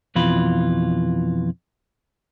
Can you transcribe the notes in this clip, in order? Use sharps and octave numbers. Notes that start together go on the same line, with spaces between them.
F2 B2 E3 F4 B5